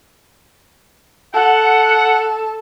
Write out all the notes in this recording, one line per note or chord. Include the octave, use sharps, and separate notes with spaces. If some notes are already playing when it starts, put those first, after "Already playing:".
A4 F#5